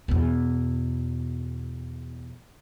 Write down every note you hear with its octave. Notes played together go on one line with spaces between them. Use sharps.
E2 B2